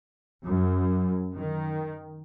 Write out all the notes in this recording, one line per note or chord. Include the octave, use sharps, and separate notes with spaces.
F#2
D#3